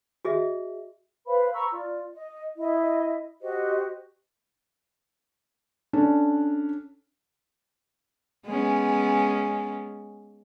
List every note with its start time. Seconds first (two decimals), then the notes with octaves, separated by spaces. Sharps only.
0.25 F#4 G#4 D#5 E5
1.27 B4 C5 F5 B5
1.54 A#5 B5 C#6 E6
1.72 F4 D5
2.14 D#5
2.56 E4 D#5
3.41 F#4 G4 C5 D#5
5.93 C#4 D4 A4
8.46 G#3 B3 C#4